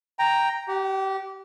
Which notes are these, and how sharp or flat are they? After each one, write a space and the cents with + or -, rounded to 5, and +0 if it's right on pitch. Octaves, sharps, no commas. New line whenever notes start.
G5 +0 A#5 +0
G4 -25 F#5 +20